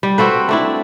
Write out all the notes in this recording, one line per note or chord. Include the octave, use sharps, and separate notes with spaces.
G3
C4 F#4 A4 B4
A3 D4 E4